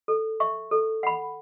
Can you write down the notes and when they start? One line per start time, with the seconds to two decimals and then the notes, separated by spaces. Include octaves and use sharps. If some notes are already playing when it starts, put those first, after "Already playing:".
0.08 A4
0.40 E5 C#6
0.71 A4
1.03 F#5 B5